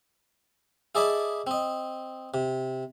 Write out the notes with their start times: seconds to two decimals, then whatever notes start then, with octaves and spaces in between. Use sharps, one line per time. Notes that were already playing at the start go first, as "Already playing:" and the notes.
0.95 E4 G#4 D5 D#5 A5 B5
1.47 C4 D#5
2.34 C3